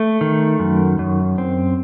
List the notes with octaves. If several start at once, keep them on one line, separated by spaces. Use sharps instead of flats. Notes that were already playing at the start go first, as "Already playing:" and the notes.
Already playing: A3
D#3
F#2
F#2
C4